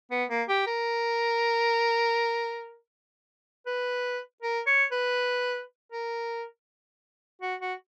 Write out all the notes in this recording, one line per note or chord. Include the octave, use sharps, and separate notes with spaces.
B3
A#3
G4
A#4
B4
A#4
C#5
B4
A#4
F#4
F#4